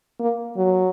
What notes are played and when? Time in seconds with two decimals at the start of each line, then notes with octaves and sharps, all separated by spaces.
0.19 A#3
0.57 F#3